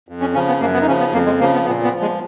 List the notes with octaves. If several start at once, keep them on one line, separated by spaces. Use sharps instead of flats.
F2
C#4
C#3 F3 C#4
B3
F#2 A#3
B3
D#4
C#3 F3 C#4
B3
F2 A#3
G#3
C#3 F3 A#3
B3
A#2 B3
B3
F3
G#3